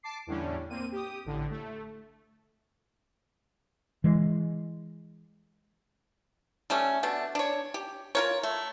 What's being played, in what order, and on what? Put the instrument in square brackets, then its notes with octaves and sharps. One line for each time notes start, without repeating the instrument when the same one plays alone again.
[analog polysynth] A5 D6 C7
E2 A2 D3 G3 C#4 D4
A#3 C4 D#7
G4 D#6
A1 A2 D3
A3
[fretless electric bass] E3 G#3
[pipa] G3 A3 C#4
B2 A3 D4
D4 C#5
G4
F4 A#4 C#5
A3